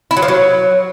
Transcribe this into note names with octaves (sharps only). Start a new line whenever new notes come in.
E4
F#3
F3
F#3